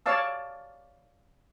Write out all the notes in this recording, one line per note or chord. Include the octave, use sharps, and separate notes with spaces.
C#5 D5 F5 A5 E6